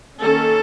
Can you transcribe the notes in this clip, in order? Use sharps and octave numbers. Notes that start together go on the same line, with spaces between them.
D#3 A#3 C#4 A4